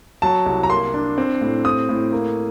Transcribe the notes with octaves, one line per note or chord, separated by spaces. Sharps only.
F#3 A5
C2
A#5
A#3 C6
D4
C4
A2
C4 D#6
A2
A#3